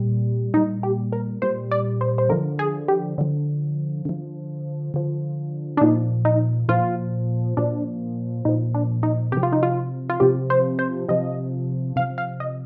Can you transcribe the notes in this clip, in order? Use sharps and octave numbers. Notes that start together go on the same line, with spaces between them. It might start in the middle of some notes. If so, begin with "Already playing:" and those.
Already playing: A#2 G3
A#2 G3 D#4
G4
A#4
A#2 G3 C5
D5
C5
C5
D3 F3 A#4
G#4
G4
D3 F3
D3 F3
D3 F3
D4
A#2 F3 D#4
D#4
A#2 F3 F4
A#2 F3 D4
A#2 F3 D#4
D4
D#4
C3 F3 G4
F4
D#4
F4
F4
C3 F3 G4
C5
C5
C3 F3 D#5
C3 F3 F5
F5
D#5